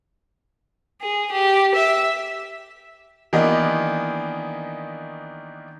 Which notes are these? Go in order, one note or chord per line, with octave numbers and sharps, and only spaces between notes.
G#4
G4
E5
D#3 E3 A#3 B3 D4 D#4